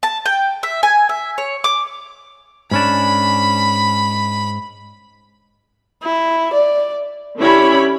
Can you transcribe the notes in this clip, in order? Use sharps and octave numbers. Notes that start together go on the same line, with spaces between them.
A5
G5
E5
G#5
E5
C#5
D6
G#2 C#4 D4 B5
E4
D5
D3 C#4 E4 G4 C#5 B5